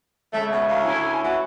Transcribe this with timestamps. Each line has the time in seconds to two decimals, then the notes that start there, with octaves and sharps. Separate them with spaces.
0.33 C#3 G#3 A3 E5
0.52 B2
0.68 D2 F5
0.85 A3 C#4 E4 G#5
1.24 E3 F#4